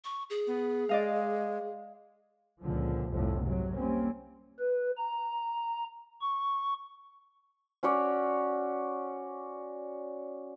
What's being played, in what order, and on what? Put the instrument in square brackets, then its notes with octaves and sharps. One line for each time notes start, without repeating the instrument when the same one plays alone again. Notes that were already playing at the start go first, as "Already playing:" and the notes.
[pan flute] C#6
G#4
[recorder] B3
[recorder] G#3 [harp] D5 D#5 F5
[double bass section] C#2 A#2 D3 F3
F1 C2 F2 A2 F3
G#2 C3 F#3
G3 A#3 C4 C#4
[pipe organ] B4
A#5
C#6
[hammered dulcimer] C#4 F#4 C#5 D5